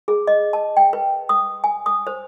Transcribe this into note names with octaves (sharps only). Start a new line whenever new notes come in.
G#4
D#5
A5
G5
B4
D#6
G#5
D#6
C5